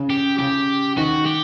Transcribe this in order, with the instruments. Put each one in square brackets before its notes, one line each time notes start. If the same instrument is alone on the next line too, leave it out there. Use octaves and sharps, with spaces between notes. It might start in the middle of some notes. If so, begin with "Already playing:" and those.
Already playing: [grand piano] C#3
[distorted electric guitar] G4
[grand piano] C#3 [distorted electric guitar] G4
[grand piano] D#3 [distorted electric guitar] F#4
[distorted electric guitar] G4